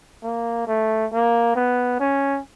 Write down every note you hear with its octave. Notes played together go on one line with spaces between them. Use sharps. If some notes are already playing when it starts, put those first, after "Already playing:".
A#3
A3
A#3
B3
C#4